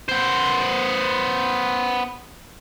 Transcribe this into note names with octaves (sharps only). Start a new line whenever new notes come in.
B3 C5